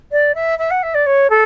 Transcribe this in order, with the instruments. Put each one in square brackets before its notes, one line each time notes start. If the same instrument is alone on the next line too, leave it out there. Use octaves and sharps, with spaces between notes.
[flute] D5
E5
E5
F#5
E5
D5
C#5
A4